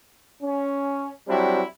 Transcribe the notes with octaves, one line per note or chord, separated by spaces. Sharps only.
C#4
F#3 G3 C4 D4 E4